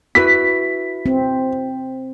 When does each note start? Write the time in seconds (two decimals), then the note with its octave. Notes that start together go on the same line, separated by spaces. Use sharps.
0.15 E4 F#4 B4 B6
1.06 C4